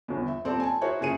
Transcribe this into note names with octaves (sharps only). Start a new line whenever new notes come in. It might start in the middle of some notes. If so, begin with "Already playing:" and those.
G1 E2
E5
D#1 C4 A4 D5
G#5 A5
E4 F#4 G#4 A#4 C5 C#5
F#1 G#4 C#7 D#7